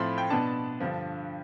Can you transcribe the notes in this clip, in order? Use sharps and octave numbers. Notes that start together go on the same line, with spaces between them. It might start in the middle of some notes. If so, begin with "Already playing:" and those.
Already playing: A2 F3 A3 C4 B5 C6
G5
B2 B3 D4 A5
G2 D3 F3